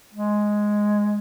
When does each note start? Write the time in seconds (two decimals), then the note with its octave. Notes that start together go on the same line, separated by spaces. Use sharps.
0.14 G#3